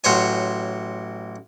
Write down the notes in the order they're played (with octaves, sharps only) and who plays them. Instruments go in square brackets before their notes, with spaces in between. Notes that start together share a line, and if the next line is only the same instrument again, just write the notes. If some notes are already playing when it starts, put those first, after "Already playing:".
[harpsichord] A1 F#3 C5 C#5 G#5